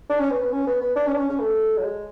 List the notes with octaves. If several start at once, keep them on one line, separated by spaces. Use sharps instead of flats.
D4
C#4
B3
B3
C#4
B3
B3
D4
C#4
D4
C#4
C#4
A3
F#3
G#3